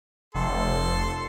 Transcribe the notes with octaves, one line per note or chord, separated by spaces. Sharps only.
F1 A4 C6